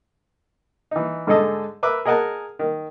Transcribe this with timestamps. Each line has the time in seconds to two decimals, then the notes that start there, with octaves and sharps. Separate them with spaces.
0.91 E3 D#4
1.27 G#2 D3 D#4 G#4 A4 D#5
1.83 A#4 B4 E5 D6
2.05 G#4 A#4 D#5 F#5 G#5 A5
2.59 D#3